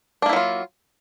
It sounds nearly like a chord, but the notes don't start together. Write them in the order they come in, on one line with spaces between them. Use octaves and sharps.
D4 A#3 E4 F#3 F4